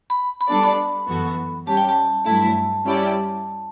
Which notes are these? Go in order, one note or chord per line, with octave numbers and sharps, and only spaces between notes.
B5
B5
G3 B3 D4 A4 D5 A5
B5
F#2 E3 B3 F#4 A4
G3 C#4 G4 A5
G5
A5
G2 F#3 A3 E4 A5
G3 C#4 E4 G4 D5